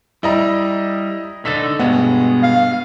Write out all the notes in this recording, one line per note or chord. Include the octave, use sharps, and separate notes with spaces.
G3 E4 D#5 A#5
D3 D#4 A4 A6 B6
G2 B2 G#3 B3
F5